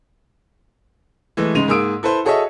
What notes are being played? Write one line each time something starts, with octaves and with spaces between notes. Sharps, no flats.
E3 G#3 A3
G#2 C#3 G#3 D#7 F7
G#2 A#3 G#4 D#6 E6 D7
E4 A4 B4 C5
F#4 G#4 A4 C#5 D#5 E5